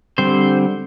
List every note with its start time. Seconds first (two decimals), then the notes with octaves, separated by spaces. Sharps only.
0.18 D3 G3 C4 C5